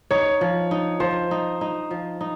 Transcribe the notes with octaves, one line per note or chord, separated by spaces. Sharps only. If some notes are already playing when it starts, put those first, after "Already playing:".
D#4 C#5
F3
D#4
F3 C5
D#4
D#4
F3
D#4